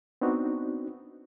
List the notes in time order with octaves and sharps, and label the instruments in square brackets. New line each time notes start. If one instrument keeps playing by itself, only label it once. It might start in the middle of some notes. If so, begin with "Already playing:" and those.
[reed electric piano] B3 C4 D4 D#4 F#4